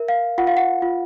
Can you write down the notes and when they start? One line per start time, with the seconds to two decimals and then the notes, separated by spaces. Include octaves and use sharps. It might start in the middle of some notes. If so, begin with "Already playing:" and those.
Already playing: A#4 E5
0.08 F5
0.38 F4 F#5
0.47 F5
0.57 F#5
0.82 F4